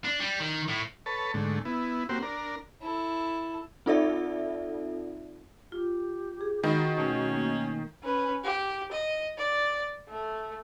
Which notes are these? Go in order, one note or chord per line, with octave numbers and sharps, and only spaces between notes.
D4
G3
D#3
A2
A4 B4 C#5 A5
G#2 D3 A3
B3 E4
A#3 C4 F#4 G4 C5
D4 A#4
E4 A4
C4 D#4 F4 A4 D5 E5
F4 G4
G#4
D#3 F#4 A#4 B5
B2 A3 C#4
A#3
C#4 B4
G4
D#5
D5
A3